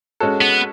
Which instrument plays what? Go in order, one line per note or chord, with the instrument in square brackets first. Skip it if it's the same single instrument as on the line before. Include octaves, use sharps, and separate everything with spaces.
[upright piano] G#3 C#4 F#4 A4
[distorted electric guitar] B3